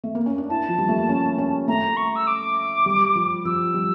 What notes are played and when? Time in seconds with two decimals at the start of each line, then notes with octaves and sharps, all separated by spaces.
0.04 A3
0.15 A#3
0.26 C#4
0.38 D4
0.49 E4 A5
0.69 F3
0.78 G3
0.89 A3
0.99 A#3
1.09 C#4
1.38 C#4
1.68 A3 A#5
1.97 C#6
2.16 E6
2.27 D6
2.86 G3
3.15 F3
3.45 F3 E6
3.74 G3